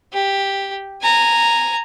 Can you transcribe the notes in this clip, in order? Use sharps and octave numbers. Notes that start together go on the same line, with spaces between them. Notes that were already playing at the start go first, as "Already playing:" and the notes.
G4
G#5 A#5